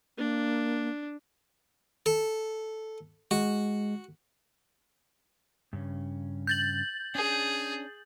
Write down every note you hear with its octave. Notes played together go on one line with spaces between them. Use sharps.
A#3 D4
A4
G#3 F#4
G2 C#3 C#4
G6 A6 F#7
C#4 D4 G#4